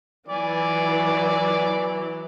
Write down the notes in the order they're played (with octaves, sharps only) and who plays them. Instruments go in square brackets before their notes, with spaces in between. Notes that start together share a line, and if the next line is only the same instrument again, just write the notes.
[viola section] E3 F#3 [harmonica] D5 G#5